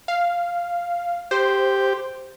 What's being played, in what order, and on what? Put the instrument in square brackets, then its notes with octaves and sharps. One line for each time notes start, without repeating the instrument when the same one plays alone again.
[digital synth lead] F5
[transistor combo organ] G4 [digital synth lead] C5